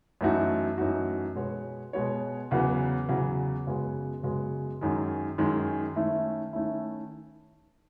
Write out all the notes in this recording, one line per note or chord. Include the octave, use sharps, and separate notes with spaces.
F#2 E3 A3 D#4 F#4
F#2 E3 A3 D#4 F#4
B2 G#3 B3 F#4 C#5
B2 G#3 B3 F#4 C#5
E2 C#3 F#3 B3
E2 C#3 F#3 B3
F#2 C#3 G#3 B3 F#4
F#2 C#3 G#3 B3 F#4
F#2 D#3 G#3
F#2 D#3 G#3
D#3 A3 C#4 E4
D#3 A3 C#4 E4